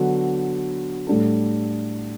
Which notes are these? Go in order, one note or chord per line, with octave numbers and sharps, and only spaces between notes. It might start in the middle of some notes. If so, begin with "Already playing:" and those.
Already playing: D3 F#3 B3 D4 F#4
A2 G3 D4 A4